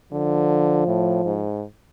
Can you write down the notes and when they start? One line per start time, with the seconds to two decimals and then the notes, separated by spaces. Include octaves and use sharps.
0.12 D3 F3
0.87 A2
1.25 G#2